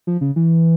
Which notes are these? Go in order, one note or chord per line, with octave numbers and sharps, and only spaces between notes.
F3
C#3
E3